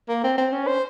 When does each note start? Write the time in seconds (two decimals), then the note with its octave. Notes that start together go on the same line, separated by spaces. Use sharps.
0.09 A#3
0.24 C4
0.38 C4
0.53 C#4
0.67 C5